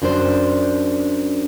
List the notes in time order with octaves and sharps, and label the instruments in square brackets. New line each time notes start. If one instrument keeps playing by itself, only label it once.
[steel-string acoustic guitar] F#2 D4 C5